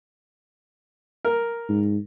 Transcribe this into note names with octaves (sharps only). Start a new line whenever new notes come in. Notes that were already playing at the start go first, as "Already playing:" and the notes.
A#4
G#2